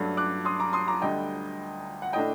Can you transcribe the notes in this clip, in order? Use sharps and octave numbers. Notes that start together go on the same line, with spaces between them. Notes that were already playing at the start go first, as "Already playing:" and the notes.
Already playing: G2 F#3 A3 D4
D6 F#6
C6 D#6
A#5 D6
C6 D#6
A#5 D6
D2 D3 G3 D#5 G5
F#5
A2 A3 D4 D#5 G5